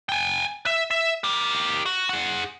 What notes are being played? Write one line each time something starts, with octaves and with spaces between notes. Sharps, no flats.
G5 G#5
E5
E5
G4 A#4
F#4
G#4 F#5